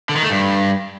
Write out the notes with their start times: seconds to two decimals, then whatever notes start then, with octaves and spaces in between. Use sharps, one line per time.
0.09 D3
0.16 D#3
0.23 A3
0.30 G2